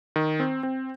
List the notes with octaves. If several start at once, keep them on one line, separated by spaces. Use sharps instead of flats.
D#3
C4
C4